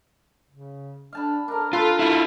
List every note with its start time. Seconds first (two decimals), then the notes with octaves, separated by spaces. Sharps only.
0.50 C#3
1.13 D4 F5 A5 B5
1.48 D4 A#4 F5
1.73 F4 A4 B4 B5
1.99 E4 F4